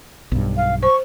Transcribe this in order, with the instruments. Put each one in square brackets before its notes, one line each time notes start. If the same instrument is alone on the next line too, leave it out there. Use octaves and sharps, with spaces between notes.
[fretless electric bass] B1 G2
[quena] F5
[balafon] C5 [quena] C#6